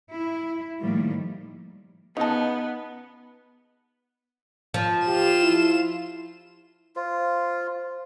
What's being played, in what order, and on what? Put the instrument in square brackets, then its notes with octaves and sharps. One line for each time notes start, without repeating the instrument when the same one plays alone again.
[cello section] E4
A2 D#3 F3 G3 A#3
[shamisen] C#3 A5 [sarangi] B3 [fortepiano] D#4 D#5
[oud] F3
[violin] F4 E7 [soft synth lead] G4
[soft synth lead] E4
[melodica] F4 [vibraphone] C5